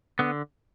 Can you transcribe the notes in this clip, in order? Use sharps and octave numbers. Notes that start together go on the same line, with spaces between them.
D3 B3